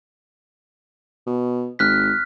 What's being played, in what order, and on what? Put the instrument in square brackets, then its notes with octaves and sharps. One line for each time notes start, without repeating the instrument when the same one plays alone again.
[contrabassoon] B2
[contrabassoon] G#1 [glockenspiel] F6 F#6 B6